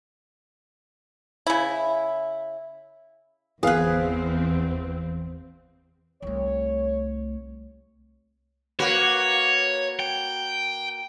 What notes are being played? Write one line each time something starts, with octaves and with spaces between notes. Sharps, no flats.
C#3 E4
G1 E2 E3 B3 C4 G#4 B4 F5
C2 A3 C#5
A#3 F#4 B4 C#5
G5